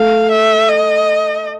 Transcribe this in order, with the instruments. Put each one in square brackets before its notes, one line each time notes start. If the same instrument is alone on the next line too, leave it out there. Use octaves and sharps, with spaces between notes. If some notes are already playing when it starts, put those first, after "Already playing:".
Already playing: [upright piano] A3 [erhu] F5
[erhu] E5
D#5